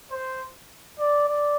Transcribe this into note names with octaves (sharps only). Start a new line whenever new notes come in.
C5
D5
D5